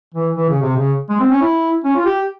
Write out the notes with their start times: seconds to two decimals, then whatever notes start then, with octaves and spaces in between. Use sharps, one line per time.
0.14 E3
0.35 E3
0.50 C#3
0.62 C3
0.76 C#3
1.10 G#3
1.20 C4
1.31 C#4
1.41 E4
1.84 C#4
1.96 F4
2.05 G4